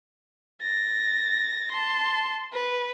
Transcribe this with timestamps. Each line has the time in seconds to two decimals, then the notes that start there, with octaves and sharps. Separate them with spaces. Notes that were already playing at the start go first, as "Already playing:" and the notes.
0.61 A6 A#6
1.71 A5 C6
2.53 B4